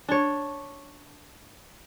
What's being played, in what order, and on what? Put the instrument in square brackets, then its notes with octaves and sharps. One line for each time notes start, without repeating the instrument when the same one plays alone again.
[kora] D4 C#5